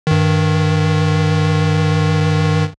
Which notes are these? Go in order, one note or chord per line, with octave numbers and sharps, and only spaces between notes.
G2 D#3